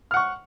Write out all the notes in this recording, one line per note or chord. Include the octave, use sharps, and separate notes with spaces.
F#5 C#6 F6